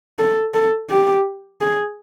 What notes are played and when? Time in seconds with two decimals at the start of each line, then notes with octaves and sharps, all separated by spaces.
0.19 A4
0.54 A4
0.90 G4
1.61 G#4